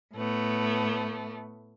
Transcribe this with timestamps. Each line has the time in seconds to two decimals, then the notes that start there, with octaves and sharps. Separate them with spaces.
0.15 A2 A3 B3